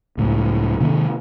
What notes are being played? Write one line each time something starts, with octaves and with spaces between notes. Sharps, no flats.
C#2 A2
C3 D#3 A#3